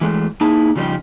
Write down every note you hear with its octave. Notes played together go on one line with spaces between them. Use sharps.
E3 G#3 A3
A#3 D#4 E4 G#4 A5
C#3 F3 G3 C#4 D#4 G4